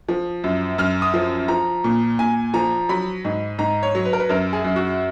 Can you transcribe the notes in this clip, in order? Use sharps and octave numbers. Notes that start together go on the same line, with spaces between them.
F3
F#2
F#2 F6
D#6
F3
F3 A#5
A#2
A#2 G#5
F3 A#5
F#3 B5
G#2
G#2 A#5
C#5
F#3
B4
A#4
B4
F#2 A#4
G#4
F#2
F#4